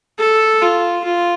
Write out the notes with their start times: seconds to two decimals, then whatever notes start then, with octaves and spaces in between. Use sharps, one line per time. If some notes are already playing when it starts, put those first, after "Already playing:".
0.19 A4
0.62 F4
1.04 F4